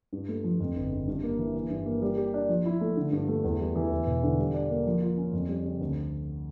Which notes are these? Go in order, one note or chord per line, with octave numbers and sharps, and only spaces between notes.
G2
A3
F3
F2
G1
C#3
G2
A#3
E3
E3
G2
A#3
G3
G4
D4
F3
E4
A3
D3
G2
A3
E2
G3
E3
E2
E1
D3
G3
D4
A#3
F3
F4
C#4
F2
G3
C#3
D2